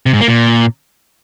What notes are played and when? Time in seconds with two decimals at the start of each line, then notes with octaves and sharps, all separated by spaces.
0.06 C3
0.13 G#2
0.21 A#3
0.28 A#2